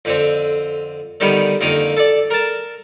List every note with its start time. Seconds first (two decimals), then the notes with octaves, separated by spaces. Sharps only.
0.05 F2 D3 C4
1.20 D3 D#3 G3 B3
1.61 F2 D3 D#3 A#3
1.97 A4 D5
2.31 A#4 A5